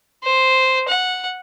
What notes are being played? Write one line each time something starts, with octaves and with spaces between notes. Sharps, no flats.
C5
F#5